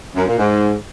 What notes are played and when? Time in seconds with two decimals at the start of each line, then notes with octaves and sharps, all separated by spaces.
0.16 F#2
0.28 A#2
0.39 G#2